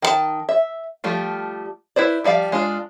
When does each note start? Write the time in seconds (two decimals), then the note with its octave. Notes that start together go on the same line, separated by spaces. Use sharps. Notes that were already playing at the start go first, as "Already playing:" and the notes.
0.02 D#3 F4 A5
0.49 E5
1.04 F3 G3 A3 F4
1.96 E4 B4 C5 D5
2.24 F3 G3 D5 F5
2.52 G#3 D4 F4